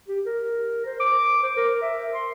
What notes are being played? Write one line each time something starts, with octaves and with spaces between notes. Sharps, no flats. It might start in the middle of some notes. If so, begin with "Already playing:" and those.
G4
A#4
C5
D6
C5
A#4
E5
C6